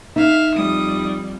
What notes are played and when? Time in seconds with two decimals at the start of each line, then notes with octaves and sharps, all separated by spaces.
0.16 D#4 E5 F5
0.54 F2 G3 D#6